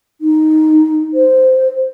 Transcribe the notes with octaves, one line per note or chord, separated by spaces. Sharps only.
D#4
C5